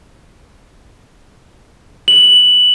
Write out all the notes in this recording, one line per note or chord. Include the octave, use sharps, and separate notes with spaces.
F#7